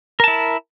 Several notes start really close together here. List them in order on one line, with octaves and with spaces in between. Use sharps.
A#4 A5 E4